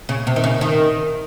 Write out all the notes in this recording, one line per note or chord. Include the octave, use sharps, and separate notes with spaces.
C#3
C3
D#3
C#3
D#3